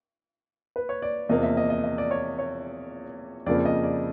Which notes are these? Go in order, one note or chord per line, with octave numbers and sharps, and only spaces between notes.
B4
C#5
D5
E2 C3 F3 A#3 D#5
E5
D#5
D#5
D#5
D5
C#5
C#5
F2 C#3 F3 A#3 D5
D#5
D5